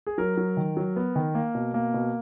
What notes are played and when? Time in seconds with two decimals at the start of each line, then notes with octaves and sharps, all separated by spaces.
0.07 G#4
0.18 F#3 A#4
0.37 F#3
0.57 D#3
0.77 F#3
0.96 B3
1.16 D#3
1.35 A#3
1.55 B2
1.74 A#3
1.94 B2